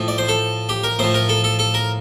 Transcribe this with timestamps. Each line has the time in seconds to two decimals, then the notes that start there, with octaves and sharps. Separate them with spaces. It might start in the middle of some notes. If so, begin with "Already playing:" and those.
Already playing: A2 F3
0.08 D5
0.18 C5
0.28 A4
0.69 G4
0.84 A#4
0.99 A2 F3 C5
1.14 A#4
1.29 A4
1.44 A4
1.59 A4
1.74 A#4